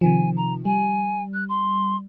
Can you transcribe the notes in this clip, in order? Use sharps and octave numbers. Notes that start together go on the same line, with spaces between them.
C3 D#3 F3 G#5
A#5
G3 G#5
F#6
C6